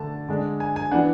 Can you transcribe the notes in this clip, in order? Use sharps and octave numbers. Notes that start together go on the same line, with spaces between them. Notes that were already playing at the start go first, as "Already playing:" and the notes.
Already playing: D3 A3 D4 A5
D3 G#3 D4
G#5
G#5
E3 B3 D4 F#5